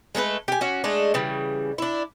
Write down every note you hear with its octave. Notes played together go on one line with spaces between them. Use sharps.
G#3 A3 A4 B4
G4 G#5
C#4 F#4
G#3 A3 D4
C#3 E3 G3
D4 E4